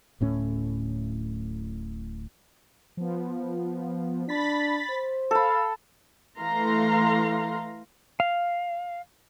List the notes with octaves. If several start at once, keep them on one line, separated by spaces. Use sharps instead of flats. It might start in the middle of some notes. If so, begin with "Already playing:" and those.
D1 A2 C#4
F3 B3
D4 B5 A6 B6
C5
A4 F5 B5
E3 A3 F5 A#5 C6
F5